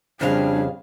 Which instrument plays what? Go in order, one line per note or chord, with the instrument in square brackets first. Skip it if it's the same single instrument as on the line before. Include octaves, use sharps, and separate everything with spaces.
[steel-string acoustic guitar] F2 C#3 F5 [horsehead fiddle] G3 G#4 [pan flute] D4